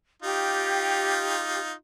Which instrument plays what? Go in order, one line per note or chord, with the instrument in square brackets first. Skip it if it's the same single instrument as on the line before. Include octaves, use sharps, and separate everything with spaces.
[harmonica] D#4 F4 [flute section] G4